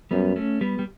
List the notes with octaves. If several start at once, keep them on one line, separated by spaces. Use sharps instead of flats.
F#2 G3 B3
A3 C#4
G3 B3
G3